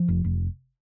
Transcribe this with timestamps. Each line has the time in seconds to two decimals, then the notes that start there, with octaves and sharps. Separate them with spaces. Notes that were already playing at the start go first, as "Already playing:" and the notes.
Already playing: F3
0.08 F1
0.25 F1